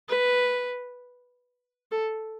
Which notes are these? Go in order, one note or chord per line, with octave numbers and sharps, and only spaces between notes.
B4
A4